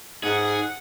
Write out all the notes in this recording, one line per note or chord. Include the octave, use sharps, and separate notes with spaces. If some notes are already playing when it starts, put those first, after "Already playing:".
G#2 G#4 F#5